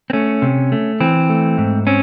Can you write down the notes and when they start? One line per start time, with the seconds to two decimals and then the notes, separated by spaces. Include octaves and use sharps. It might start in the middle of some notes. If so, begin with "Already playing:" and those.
0.10 C4
0.13 A3 C#4
0.42 C3
0.72 A3
1.00 E3 C4
1.30 A3
1.58 G#2
1.87 C4 C#4